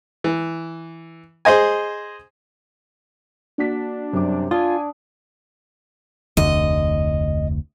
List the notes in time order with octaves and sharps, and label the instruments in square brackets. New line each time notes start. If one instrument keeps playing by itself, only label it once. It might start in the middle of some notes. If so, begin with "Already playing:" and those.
[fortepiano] E3
G#4 C5 D#5 G#5
[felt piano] A#3 F#4 B6 [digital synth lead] D4
[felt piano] F#2 G3 D6 [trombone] C3
[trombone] D4 [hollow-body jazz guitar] F4 [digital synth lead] G#5 [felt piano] D#6
[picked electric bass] F1 D2 D3 [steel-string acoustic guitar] D#5